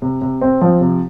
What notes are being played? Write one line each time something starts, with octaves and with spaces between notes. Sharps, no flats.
C3
C3
C4
F3
C3